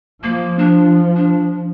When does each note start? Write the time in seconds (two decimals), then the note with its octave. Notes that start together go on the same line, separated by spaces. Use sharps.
0.23 F3 A#3
0.59 D4
1.16 D4